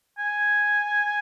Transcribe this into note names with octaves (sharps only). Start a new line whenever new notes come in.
G#5